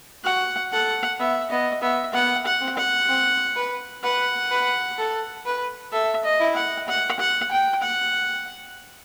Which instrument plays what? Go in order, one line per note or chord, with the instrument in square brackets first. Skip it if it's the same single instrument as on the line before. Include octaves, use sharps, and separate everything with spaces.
[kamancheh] F#4 [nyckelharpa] F#5
[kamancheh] A4 [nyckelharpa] F#5
[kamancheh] B3 [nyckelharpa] E5
[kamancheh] B3 [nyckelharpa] D#5
[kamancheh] B3 [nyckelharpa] E5
[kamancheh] B3 [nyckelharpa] F#5
[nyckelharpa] F#5
[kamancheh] C4
[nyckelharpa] F#5
[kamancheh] C4
B4
[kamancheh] B4 [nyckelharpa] F#5
[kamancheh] B4
A4
B4
[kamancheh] A4 [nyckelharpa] E5
[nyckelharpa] D#5
[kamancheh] E4
[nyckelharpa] F#5
F#5
F#5
G5
F#5